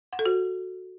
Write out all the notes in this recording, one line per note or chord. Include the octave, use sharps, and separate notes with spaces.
F#5
A4
F#4